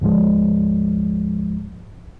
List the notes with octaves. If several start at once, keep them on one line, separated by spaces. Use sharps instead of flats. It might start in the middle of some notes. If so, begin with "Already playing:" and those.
D2 G#2 F3 G#3